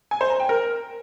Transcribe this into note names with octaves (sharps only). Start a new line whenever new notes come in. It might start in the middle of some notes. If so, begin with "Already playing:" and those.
G#5
C5
A#5
G5
A#4